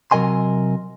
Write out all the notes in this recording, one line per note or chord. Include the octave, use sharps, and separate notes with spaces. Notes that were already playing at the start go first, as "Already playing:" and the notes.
C3 F#3 A#4 D#5 G#5 C6